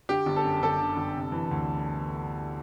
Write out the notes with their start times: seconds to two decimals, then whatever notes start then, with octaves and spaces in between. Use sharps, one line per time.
0.09 D3 G4
0.26 G1
0.36 A4
0.44 F#2
0.63 G1 A4
0.80 D3
0.97 G1
1.15 C3
1.32 E3
1.51 D2